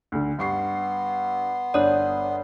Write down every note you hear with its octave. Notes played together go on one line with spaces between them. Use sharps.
D2 D3
G2 B3 C6 C#6 C7
G1 D4 C#5 D5 D#6